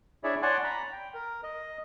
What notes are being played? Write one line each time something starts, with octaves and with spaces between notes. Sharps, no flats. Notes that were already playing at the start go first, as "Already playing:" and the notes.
D4 E4 G#4 C#5 D5 E5
C#5 D5 F#5 G#5 A5 C6
A#5 B5
G5
A#4
D#5